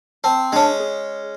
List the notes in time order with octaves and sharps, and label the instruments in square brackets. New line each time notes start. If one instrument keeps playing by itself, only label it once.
[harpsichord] C4 [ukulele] A5
[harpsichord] G#3 C#4 [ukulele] D4 A5
[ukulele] G#4